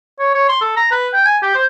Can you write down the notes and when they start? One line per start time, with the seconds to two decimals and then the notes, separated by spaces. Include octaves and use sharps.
0.19 C#5
0.34 C#5
0.49 C6
0.61 A4
0.77 A#5
0.91 B4
1.13 G5
1.25 G#5
1.42 G4
1.55 C5